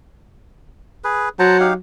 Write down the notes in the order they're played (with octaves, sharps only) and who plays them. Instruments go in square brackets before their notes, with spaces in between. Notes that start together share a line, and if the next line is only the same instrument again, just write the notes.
[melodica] G#4 B4
[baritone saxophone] F#3 [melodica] C5 A5 A#5
[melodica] D#4 G4 F5